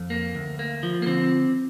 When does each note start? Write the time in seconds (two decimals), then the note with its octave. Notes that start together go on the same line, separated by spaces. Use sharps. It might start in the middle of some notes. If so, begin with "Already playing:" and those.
Already playing: F2
0.10 A#3
0.35 D2
0.59 A#3
0.83 F3
1.02 A#3
1.06 D3 C4